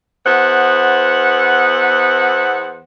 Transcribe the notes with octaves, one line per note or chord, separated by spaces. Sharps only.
E2 B3 C5 F#5